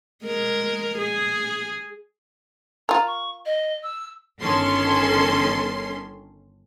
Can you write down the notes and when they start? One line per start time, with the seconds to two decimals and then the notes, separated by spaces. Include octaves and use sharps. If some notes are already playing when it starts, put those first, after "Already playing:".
0.23 G#3 A#4
0.98 G#4
2.89 F4 A#4 A#5
3.06 C#6
3.45 D#5
3.83 E6
4.39 G1 D#3 C#4 A4 C6